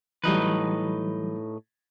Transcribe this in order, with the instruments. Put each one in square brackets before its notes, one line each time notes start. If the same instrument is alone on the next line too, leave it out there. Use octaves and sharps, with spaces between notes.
[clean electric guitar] A2 D#4 B4 [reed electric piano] E3 F#3 G3